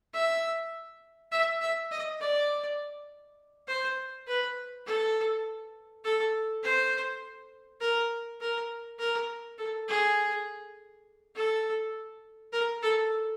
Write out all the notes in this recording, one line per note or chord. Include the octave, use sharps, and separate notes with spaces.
E5
E5
E5
D#5
D5
C5
B4
A4
A4
C5
A#4
A#4
A#4
A4
G#4
A4
A#4
A4